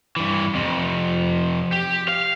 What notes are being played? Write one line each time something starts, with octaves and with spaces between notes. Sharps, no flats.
G2 E3
F2 C3
G4
F5